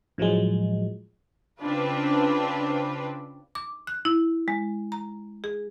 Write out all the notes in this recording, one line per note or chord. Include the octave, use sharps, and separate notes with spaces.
A2 F3 F#3 G#3
C#3 C4 D4 F4 B4
D6
F#6
E4
G#3
A#5
G#4